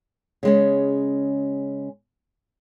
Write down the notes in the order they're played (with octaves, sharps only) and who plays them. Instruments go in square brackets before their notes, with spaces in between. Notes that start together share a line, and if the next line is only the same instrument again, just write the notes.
[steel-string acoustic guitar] C#3 G#3 C#4